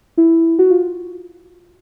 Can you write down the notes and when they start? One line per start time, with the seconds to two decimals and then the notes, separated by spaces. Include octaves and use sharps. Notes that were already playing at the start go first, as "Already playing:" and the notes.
0.18 E4
0.59 F#4
0.70 F4